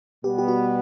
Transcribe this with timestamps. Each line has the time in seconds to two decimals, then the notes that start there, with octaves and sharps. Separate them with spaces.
0.24 B2 G3 B3 G4
0.38 G4
0.48 F#4